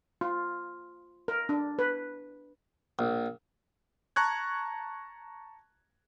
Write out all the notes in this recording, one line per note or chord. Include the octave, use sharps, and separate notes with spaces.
F4
A#4
D4
B4
A#1
A5 A#5 C#6 F#6 G#6